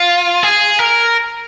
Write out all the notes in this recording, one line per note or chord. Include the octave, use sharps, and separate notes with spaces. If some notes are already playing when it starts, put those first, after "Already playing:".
Already playing: F4
G#4
A#4